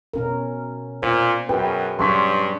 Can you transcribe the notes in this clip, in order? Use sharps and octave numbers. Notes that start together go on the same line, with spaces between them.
B2 C#4 A#4
A#2 C5
F#2 G#4 B4 G5
G2 F#3 C#4 C6 C#6 B6